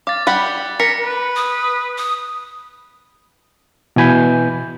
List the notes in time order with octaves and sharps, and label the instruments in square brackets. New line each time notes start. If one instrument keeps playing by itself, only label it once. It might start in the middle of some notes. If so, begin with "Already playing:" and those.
[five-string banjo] F5 [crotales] D6 A6
[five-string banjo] G3 F#5 B5
[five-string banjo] A#4 [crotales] A#6 B6 C#7
[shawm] B4
[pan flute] D#6
D#6
[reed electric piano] B2 E3 G#5 B5 G6